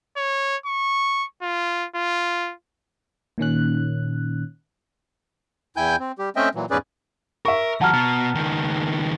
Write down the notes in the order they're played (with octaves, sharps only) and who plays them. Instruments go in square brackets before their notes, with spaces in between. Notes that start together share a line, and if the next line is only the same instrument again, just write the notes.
[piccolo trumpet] C#5
C#6
F4
F4
[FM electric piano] A#2 D#3 C#4 F#6
[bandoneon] E2 E4 G5 G#5 G6
C4
G3 G4
A3 C4 C#4 D#5 E5 G5
A#2 E3 F#3
E2 G#2 C#4 G#4 B4 D5
[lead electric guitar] A#4 [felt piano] E5 C#6
[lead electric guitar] E3 F#3 [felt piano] F#5 [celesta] A5 A#5 F6
[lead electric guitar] B2
C#2 D#3